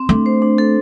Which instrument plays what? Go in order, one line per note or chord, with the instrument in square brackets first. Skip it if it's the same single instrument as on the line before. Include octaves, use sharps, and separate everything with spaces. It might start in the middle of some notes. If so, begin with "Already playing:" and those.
Already playing: [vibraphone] C4
[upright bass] A3 [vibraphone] D4
[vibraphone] C5
D4
A4